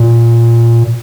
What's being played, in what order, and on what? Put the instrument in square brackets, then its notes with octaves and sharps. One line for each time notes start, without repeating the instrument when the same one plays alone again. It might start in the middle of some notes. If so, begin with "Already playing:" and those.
Already playing: [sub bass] A#2